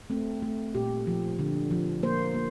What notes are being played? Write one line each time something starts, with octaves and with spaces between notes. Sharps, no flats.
A3 C4
A3
A#2 G4
F3
D3
F3
A#3 C5
A#3